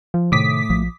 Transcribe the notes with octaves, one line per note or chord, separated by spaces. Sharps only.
F3
A2 C3 D#3 D6 D#6 B6
A#1 F3